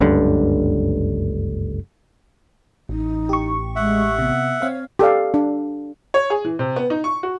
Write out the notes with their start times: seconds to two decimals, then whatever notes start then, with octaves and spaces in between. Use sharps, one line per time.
0.01 F#1 C#2 G2 D3
2.89 A1 D#4
3.29 G4 C#6
3.76 G#3 E5 F#5
4.19 C3 B3
4.62 C4 C#5 F5
4.99 G4 A4 D5 F5
5.34 D4
6.14 C#5
6.30 G#4
6.45 E3
6.59 C3
6.76 B3
6.90 D#4
7.04 C#6
7.23 F#4